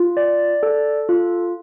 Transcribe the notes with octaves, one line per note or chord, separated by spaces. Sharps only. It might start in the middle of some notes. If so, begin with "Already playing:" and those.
Already playing: F4
D5
A4
F4